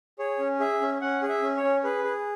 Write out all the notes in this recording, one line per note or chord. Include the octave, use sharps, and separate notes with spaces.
G#4 C#5
C#4
G#4 E5
C#4
C#4 F#5
G#4
E5
C#4
C#5
C#4
G#4 B4
G#4